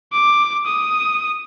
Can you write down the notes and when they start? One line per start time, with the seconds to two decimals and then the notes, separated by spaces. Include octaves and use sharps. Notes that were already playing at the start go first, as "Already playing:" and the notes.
0.13 D6
0.66 D#6